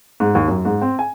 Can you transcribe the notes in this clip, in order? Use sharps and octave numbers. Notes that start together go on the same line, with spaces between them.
G#2
D#2
F#2
G#2
C4
G#5